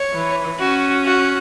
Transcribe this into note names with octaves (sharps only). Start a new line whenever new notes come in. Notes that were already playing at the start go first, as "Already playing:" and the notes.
Already playing: C#5
E3
C#4 F#4
F#4